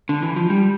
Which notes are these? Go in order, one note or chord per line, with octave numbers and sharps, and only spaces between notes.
D3
E3
F3
G3